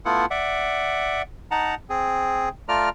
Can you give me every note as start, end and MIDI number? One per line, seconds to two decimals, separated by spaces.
0.05 0.26 57
0.05 0.26 59
0.05 0.26 64
0.05 0.26 65
0.05 0.26 78
0.31 1.22 74
0.31 1.22 76
0.31 1.22 78
1.51 1.75 63
1.51 1.75 78
1.51 1.75 81
1.51 1.75 82
1.90 2.49 60
1.90 2.49 68
2.69 2.89 57
2.69 2.89 65
2.69 2.89 74
2.69 2.89 82
2.69 2.89 89